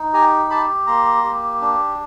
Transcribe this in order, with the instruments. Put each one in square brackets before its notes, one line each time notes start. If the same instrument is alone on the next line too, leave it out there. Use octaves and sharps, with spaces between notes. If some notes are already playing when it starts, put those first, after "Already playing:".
Already playing: [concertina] D#4
G4 G#5 A#5
G4 A5 B5
A#3 A#5 C6
G4
D4